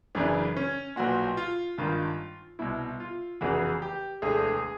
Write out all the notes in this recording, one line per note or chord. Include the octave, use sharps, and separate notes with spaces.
F#1 F#2 C#3 E3 D4
C#4
B1 A#2 F#4
F4
G#1 G2 D#3 F4
C2 B2 E4
F4
F1 E2 C#3 E3 F#4
G4
E1 D2 D3 G#4